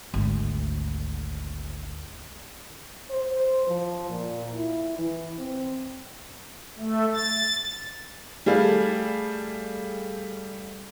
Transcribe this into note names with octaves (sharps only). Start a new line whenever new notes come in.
G#1 D2
C5
F3
A#2
E4
E3
C4
A3
A6
G3 A3 G#4 F5